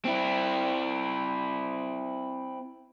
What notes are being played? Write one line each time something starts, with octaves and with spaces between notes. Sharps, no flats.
C4 E4